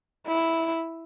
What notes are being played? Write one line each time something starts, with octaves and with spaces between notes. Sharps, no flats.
E4